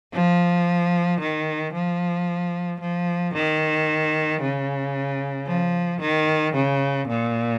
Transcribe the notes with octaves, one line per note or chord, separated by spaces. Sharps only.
F3
D#3
F3
F3
D#3
C#3
F3
D#3
C#3
A#2